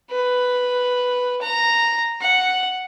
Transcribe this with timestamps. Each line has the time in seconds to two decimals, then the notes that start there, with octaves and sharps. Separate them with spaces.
0.11 B4
1.42 A#5
2.21 F#5